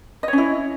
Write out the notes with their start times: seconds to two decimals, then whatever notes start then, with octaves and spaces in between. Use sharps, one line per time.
0.23 D#5
0.28 C#5
0.33 C#4
0.38 E4